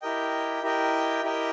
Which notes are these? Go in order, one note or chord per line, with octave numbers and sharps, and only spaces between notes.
E4 G4 A#4 D#5 G5
E4 G4 A#4 D#5 G5
E4 G4 A#4 D#5 G5